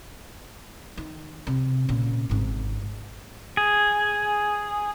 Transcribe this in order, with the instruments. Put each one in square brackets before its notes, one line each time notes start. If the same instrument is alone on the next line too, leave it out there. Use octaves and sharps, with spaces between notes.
[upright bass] D#3
C3
A#2 C#3
G#1 G#2
[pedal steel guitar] G#4